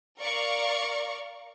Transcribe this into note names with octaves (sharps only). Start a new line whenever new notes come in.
A#4 D5 F5 C#6